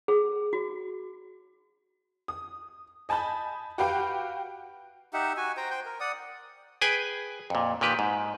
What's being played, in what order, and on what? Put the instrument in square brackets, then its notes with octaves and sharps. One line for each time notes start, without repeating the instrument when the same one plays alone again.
[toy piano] G#4
F#4
[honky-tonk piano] D#6
D#5 G#5 A5 B5 G6
F#4 G4 B4 F5 G5
[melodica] D#4 G4 E5 F#5
F#4 G#5
C5 G5 A#5
C5 G5
A#4
D5 F#5 D#6
[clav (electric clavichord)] G#4 B4 G5 G#5
F2 A#2
A#2 D#3 G4 B4
G#2